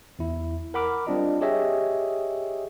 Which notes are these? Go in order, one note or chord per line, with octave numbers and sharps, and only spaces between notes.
E2 E4
A#4 F#5 B5 D6 F6
G3 C4 D4 F4 D#5
G4 G#4 C#5 D#5 E5